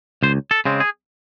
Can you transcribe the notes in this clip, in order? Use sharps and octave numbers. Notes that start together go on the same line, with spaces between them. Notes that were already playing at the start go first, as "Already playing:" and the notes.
C#2 C5
A4
C#3 G#3 C4
G#4